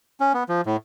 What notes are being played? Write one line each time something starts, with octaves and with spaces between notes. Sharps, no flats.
C#4
B3
F3
A2